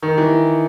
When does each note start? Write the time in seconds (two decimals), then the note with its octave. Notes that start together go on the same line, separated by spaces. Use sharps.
0.02 D#3
0.18 E3